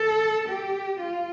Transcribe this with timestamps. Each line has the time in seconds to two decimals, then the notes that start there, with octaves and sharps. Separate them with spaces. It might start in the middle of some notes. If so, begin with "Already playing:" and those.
Already playing: A4
0.48 G4
0.99 F4